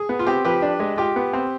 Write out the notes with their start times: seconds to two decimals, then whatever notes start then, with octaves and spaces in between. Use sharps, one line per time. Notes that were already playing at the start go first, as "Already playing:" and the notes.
Already playing: G#4
0.09 B3
0.19 F4
0.27 C4 G4
0.45 F3 G4 B4
0.62 D4
0.80 G#3
0.97 F4 G4
1.16 B3
1.33 C4